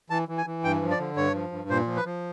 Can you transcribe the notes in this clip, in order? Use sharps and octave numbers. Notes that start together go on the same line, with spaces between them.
E3 A5
E3
G#5
E3
G2 G5
F3
D5
D3
G2 C#5
F3
G2
A#2 C5
F3
B4
F3